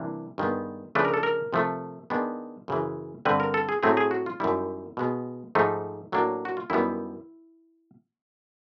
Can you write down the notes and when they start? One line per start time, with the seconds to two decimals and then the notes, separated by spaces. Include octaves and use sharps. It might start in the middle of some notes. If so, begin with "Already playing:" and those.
Already playing: C3 E3 G3 A#3 D4
0.38 G2 D#3 G#3 B3
0.95 C#3 F3 A3 D4 B4
1.05 A#4
1.14 A4
1.23 A#4
1.53 C3 F3 A3
2.10 D#3 G#3 B3 D4
2.68 F#2 C#3 E3
3.25 G2 D3 G3 C4 B4
3.40 A#4
3.54 A4
3.69 G#4
3.83 A2 F#3 A3 C4 G#4
3.97 G#4
4.11 F#4
4.26 F4
4.40 F#2 D#3 G3 E4
4.97 B2 G#3 B3
5.55 G#2 F3 A3 D#4
6.12 A2 F#3 A#3 D4
6.45 F#4
6.57 F4
6.70 F#2 D#3 G3 B3 E4